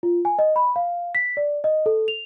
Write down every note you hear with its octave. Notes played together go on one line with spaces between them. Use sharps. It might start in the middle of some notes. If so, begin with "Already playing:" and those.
F4
G#5
D#5
B5
F5
B6
D5
D#5
A4
F7